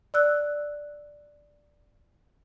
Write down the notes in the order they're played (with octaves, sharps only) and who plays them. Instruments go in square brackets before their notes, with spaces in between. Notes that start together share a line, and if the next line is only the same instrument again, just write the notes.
[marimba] D5 E6 F#6